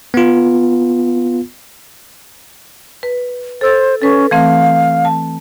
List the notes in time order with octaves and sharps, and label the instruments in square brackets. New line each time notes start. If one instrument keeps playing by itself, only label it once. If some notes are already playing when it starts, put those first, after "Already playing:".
[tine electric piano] B3 F4
[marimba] B4
[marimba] A4 E6 A6 [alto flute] C5
[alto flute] C#4 [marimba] A4 B4
[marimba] E3 A3 C4 [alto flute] F5
[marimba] A5